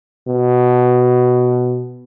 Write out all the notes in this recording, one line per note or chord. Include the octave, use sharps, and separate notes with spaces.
B2